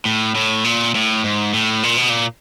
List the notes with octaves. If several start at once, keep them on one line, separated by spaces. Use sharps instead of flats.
A2
A2
A#2
A2
G#2
A2
A#2
B2
A#2